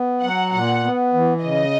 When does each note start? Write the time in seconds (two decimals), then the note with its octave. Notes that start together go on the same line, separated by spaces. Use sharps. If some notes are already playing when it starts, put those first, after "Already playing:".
Already playing: B3
0.22 F#3 F#5
0.52 A#2 F#5
0.84 B3
1.14 E3
1.44 C#3 D#5